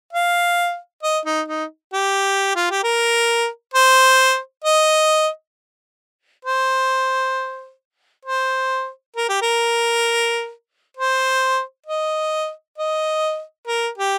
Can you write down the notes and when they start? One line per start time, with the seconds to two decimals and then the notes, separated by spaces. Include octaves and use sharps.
0.13 F5
1.03 D#5
1.26 D#4
1.48 D#4
1.93 G4
2.56 F4
2.71 G4
2.84 A#4
3.74 C5
4.64 D#5
6.45 C5
8.25 C5
9.16 A#4
9.29 G4
9.42 A#4
10.97 C5
11.87 D#5
12.78 D#5
13.67 A#4
13.98 G4